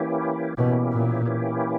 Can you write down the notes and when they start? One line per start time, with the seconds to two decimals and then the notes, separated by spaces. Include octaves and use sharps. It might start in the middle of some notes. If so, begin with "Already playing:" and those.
Already playing: E3 A#3 C#4 E4 G4
0.57 B2 E3 A#3 C#4 E4 G4
0.91 A#2
1.26 E3 A#3 C#4 E4 G4